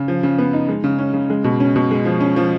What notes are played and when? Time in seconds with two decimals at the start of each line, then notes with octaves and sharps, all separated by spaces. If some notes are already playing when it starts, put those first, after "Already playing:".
Already playing: C#3
0.08 F3
0.23 C#3
0.38 B3
0.53 D#4
0.68 G#3
0.84 C#3
0.98 C#4
1.14 C#3
1.30 G#3
1.44 B2
1.60 C#4
1.76 B2
1.91 G#3
2.05 F3
2.21 C#4
2.36 F3